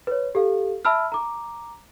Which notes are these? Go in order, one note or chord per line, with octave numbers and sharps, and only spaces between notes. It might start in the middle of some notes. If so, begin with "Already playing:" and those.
B4 C#5
G4 A4 F5
E5 A5 B5 E6 F6
A#5 D6